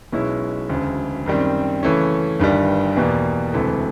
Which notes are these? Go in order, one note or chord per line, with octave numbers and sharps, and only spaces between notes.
B1 B2 G#3 C#4 E4
E1 D2 C#3
F#2 D#3 G3 C4
C#3 E3 A3 C#4
G1 G2 D#3 G3
E2 B2 G3 A#3
E1 D2 C3 E3 A3